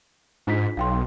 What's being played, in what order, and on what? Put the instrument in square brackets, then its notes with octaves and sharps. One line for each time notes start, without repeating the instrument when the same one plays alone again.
[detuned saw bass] G#2 [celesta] D4 F4 B6
[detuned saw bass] B1 [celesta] F5 G5 C6